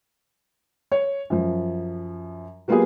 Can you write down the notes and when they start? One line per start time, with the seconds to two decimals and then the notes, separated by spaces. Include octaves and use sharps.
0.92 C#5
1.30 F#2 F3
2.68 F#3 A#3 B3 F4 G4 G#4